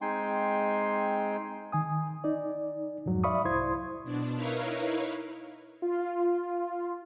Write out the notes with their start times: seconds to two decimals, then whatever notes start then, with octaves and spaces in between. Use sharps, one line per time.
0.01 G#3 C4 D#4 G5 G#5 C6
1.72 D#3 G#5 D#6
2.24 D#4 D5
3.06 F2 G#2 F#3
3.24 D5 E5 F5 B5 C#6 D#6
3.45 C2 E4 C5 C6 D#6 G#6
4.04 B2 D4
4.36 D#4 E4 A#4 B4 C#5 F5
5.82 F4